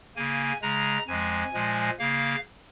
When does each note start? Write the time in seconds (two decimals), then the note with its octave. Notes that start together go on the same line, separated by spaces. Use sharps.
0.16 C#3 A#3 G#5
0.62 C#3 G#3 A#5
1.07 F2 F3 G#3 G#5
1.54 A#2 F3 G#3
1.99 C#3 A#3 F5